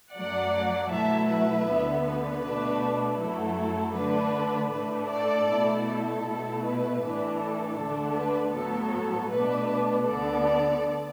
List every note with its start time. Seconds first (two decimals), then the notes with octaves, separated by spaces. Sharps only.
0.14 F#2 F#3 A3 D5 F#5
0.90 B2 F#3 A3 E4 E5 A5
1.28 B4 E5
1.67 D2 D3 B3
2.05 B4
2.43 B2 A3 D4
3.19 F#2 F#3 A3 E4 A4
3.96 D3 A3 D4 B4
4.72 A2 A3 D4 B4
5.10 A4 D5
5.49 B2 A3 E4
5.87 A4
6.25 B2 A3 E4
6.63 B4
7.02 A2 E3 D4
7.40 A4
7.78 D2 D3 A3 D4
8.17 B4
8.54 A2 F#3 B3 A4
9.31 B2 A3 D4 B4
10.07 D2 D3 B3 D4 A4 D5